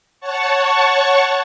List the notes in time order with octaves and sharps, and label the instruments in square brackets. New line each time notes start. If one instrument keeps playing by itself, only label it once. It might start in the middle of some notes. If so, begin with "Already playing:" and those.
[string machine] C#5 F#5 A5 C#6